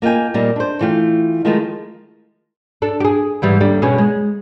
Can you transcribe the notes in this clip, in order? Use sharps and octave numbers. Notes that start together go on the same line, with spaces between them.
A#3 F4 D#5 G5 G#5
A#2 G3 A#3 C4 D#4
D4 C5
E3 A3 F4 G5
D#3 F3 G#3 A3 F4
D4 A4
G4 G#4
G#2 E3 G3
D#2 D3 G3
B2 G#3 C#4
G#3